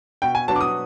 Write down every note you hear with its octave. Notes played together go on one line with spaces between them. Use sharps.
B2 G5
G#5
F#3 B3 D4 F#4 A5
D6
D#6